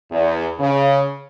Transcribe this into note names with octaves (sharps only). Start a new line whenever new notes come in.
E2
C#3